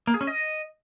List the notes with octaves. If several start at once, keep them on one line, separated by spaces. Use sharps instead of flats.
A#3
G#4
C#4
D#5